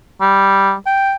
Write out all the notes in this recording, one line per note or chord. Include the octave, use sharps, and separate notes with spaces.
G3
G5